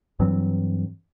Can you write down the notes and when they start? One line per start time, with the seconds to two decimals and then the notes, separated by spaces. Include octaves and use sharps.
0.20 G2 E3 F#3 C4